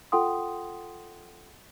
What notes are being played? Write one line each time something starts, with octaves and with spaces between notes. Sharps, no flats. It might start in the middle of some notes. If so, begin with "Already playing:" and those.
F4 A4 F#5 G5 C6 D#6